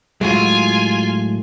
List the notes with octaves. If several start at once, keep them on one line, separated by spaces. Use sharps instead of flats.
A2 F#3 G#3 F4 G#5